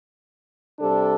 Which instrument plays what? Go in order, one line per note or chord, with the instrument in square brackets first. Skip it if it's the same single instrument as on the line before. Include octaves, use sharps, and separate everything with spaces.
[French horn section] C3 G3 D4 A4